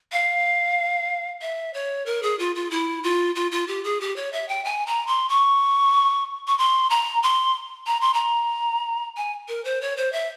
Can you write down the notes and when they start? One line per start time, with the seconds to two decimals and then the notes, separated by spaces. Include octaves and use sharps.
0.12 F5
1.41 E5
1.74 C#5
2.06 A#4
2.23 G#4
2.39 F4
2.56 F4
2.71 E4
3.03 F4
3.36 F4
3.52 F4
3.68 G4
3.84 G#4
4.01 G4
4.16 C#5
4.33 E5
4.49 G5
4.65 G#5
4.87 A#5
5.07 C6
5.29 C#6
6.48 C#6
6.58 C6
6.90 A#5
7.23 C6
7.87 A#5
8.01 C6
8.14 A#5
9.17 G#5
9.48 A#4
9.65 C5
9.81 C#5
9.97 C5
10.13 E5